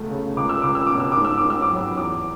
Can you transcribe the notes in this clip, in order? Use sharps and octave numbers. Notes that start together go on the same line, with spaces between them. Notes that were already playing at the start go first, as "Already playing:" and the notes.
Already playing: C#2 B2 A3
C#3
C#2 D6
E6
C#2 D6
E6
B2 D6
E6
D6
G#2
E6
D6
G#2
E6
D6
F#3
E2 D6